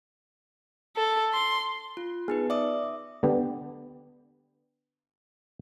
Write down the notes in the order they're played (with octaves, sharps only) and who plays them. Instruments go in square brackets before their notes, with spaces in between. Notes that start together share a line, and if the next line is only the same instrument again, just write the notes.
[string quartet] A4
C6
[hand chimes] F4
[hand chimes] B3 D#4 B4 [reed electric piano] G#4
[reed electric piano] D5 [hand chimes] E5 D6 D#6
[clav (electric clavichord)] D3 B3 G4